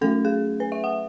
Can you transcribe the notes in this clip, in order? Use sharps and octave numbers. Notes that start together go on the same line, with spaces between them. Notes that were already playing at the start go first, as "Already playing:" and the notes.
F#3 A3 C#4 A4
G#4
B4
E5
F#5